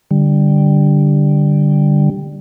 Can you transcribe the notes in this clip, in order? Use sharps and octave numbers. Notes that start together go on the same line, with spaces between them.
D3 G3